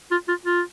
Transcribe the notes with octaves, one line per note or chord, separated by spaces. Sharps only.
F4
F4
F4